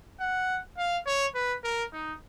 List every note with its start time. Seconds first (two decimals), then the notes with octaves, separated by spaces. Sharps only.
0.20 F#5
0.78 F5
1.06 C#5
1.35 B4
1.64 A#4
1.93 D#4